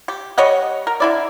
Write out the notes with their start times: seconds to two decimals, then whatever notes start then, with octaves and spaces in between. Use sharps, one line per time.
0.08 G4
0.38 G3 C#5 D#5 F#5
0.87 A#4
1.00 D3 E4 D5